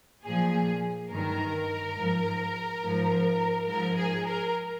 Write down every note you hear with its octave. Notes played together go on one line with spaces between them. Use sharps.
A#2 F3 G#4
G2 D#3 A#4
G#2 F3
G#2 F3
G#2 F3 A#4
G#4
A#4